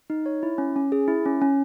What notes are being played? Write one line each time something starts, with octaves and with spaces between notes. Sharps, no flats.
D#4
C#5
E4
C#4
C#4
G#4
E4
C#4
C#4